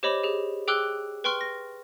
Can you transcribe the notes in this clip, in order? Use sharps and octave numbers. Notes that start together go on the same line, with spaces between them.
G4 C5 C#5 D#5 B5 D6
G4 G#4
G#4 G5 D6 E6 F#6 G7
B4 G5 C6 C#6 F6
A#6